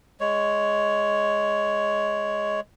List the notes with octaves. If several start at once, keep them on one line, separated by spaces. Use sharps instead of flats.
G#3 C#5